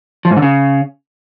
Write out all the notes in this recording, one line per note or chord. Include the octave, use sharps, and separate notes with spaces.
F3
G#2
D3
C#3